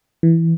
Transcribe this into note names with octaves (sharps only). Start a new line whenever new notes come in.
E3